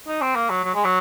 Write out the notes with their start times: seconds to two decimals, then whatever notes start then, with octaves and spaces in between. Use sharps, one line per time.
0.08 D#4
0.22 C4
0.36 A#3
0.50 F#3
0.64 F#3
0.75 G#3
0.84 F#3